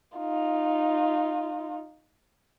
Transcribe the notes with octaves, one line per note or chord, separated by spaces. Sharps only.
D#4 F4